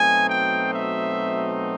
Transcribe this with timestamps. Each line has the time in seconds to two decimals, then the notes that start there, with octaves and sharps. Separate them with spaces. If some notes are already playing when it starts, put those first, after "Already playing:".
Already playing: B2 F#3 A3 C4 D#4 G#5
0.29 G5
0.72 E5